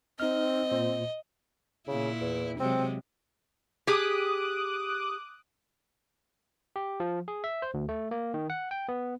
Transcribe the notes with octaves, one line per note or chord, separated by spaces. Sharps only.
C4 D#4 D#5 F6
A#2 C5
A#2 C#3 E4
E2
C3 F#3 G#3 C4
G4 G#4 D6 D#6 F#6
G4
F3
G#4
E5
C5
D2
A3
A#3
D#3
F#5
G5
B3